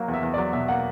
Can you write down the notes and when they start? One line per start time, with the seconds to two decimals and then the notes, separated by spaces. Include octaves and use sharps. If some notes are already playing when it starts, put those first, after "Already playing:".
Already playing: F#3 A#3
0.08 E2
0.14 E5
0.23 E2
0.34 F#3 D5
0.53 B2 E5
0.68 A#3 F#5